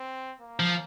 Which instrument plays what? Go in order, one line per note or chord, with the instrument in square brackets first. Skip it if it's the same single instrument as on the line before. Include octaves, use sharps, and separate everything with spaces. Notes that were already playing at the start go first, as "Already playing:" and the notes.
Already playing: [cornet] C4
A#3
[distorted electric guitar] F3